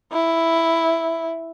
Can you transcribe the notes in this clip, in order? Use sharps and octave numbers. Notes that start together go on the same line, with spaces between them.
E4